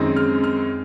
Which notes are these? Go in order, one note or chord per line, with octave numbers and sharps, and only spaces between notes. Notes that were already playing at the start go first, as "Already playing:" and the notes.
Already playing: F#2 D#3 G#3 C4
F6
F6